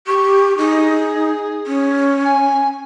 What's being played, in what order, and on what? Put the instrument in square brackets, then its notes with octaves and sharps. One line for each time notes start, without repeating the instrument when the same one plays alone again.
[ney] G4 [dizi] C#6
[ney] D#4 [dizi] G#4
[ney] C#4
[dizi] G#5